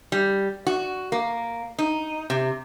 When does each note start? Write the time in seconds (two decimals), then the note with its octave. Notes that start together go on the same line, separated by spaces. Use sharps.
0.12 G3
0.67 F#4
1.12 A#3
1.79 D#4
2.30 C3